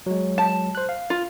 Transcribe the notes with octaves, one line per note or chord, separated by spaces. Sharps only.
F#3 G#3
A5
C5 F#6
F5
F4